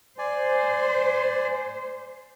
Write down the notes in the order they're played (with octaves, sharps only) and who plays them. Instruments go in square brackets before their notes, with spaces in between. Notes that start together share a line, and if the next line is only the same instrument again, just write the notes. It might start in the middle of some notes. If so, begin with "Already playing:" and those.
[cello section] C5 [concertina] D5 G#5